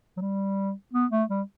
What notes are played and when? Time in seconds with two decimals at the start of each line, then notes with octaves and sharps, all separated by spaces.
0.17 F#3
0.21 G3
0.94 B3
1.11 A3
1.29 G3